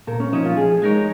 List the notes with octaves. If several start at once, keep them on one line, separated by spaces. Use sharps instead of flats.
A#2 A#4
C#4
F3 C#4 D#4
F4
F3 G#4
G#3 D#4 A#4 C#5